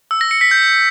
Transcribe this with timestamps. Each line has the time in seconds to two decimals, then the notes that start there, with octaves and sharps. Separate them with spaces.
0.11 E6
0.21 A#6
0.31 C#7
0.41 B6
0.51 G6